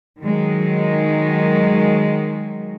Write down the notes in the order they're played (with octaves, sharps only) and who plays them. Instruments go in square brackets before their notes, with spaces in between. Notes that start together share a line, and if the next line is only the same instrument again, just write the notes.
[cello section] D#3 F#3 G#3